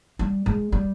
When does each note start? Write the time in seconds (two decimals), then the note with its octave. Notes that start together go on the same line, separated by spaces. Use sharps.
0.19 G3
0.46 G#3
0.72 G3